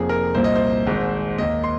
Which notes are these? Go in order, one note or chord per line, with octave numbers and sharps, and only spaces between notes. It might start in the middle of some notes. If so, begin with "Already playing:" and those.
Already playing: F1 F2 F3 A#3 G#4
A#4
C2 A#2 A#3 C5
D#5
C5
G#1 G#2 G#3
D#2 D#3 A#3 D#5
C6